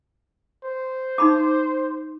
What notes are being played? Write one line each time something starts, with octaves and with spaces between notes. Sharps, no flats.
C5
D#4 B5 D6